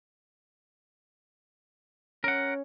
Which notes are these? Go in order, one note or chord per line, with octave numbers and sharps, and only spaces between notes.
C#4 A#4 F#5